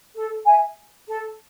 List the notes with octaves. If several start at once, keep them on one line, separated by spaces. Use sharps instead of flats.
A4
E5 G#5
A4